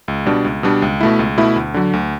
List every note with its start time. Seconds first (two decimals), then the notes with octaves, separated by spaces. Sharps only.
0.08 C#2
0.26 B2 G3 D4
0.45 C#2
0.63 B2 G3 D4
0.82 C#2
1.01 B2 A3 E4
1.19 C#2
1.37 B2 A3 E4
1.56 D2
1.74 D3 F#3
1.93 D2